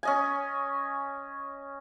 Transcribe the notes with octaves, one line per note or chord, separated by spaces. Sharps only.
C#4 D#5 G#5